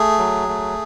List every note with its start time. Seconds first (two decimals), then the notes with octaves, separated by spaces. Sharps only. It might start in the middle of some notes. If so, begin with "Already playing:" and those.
Already playing: A3 G#4
0.18 F#3
0.48 A3